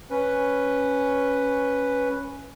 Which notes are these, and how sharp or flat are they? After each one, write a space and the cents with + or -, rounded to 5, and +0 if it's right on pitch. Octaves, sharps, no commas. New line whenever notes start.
C#4 +0 B4 +0